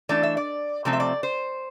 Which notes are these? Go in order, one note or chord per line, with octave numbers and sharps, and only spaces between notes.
E3 A3 D4 D5
E5
D5
C3 F3 A3 C4 D5
E5
D5
C5